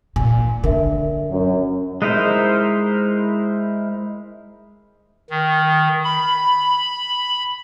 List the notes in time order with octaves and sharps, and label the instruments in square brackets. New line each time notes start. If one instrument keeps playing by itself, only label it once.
[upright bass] A#2 [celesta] G#5
[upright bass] D3 [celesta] A#4 E5
[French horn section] F#2
[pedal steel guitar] G#3 D#4 E4 A#4 C5
[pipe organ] D#3
B5